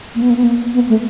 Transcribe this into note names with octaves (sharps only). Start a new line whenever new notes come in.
A#3
B3
A#3
B3
A#3
B3
A3